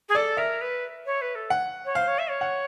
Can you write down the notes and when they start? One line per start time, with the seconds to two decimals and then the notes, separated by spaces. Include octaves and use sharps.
0.08 G#4
0.15 A4 D5
0.37 A#4 E5
0.61 B4
1.05 C#5
1.21 B4
1.35 A4
1.50 F#5
1.85 C#5
1.95 C5 F5
2.07 C#5
2.18 E5
2.29 C#5
2.41 F#5